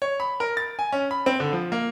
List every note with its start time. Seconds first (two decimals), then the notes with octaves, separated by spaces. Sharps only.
0.02 C#5
0.20 B5
0.40 A#4
0.57 A6
0.79 G#5
0.92 C#4
1.11 B5
1.26 C4
1.40 D3
1.53 F3
1.72 A#3